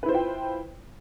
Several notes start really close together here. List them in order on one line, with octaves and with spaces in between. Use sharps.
B4 E4 C5 F4 G5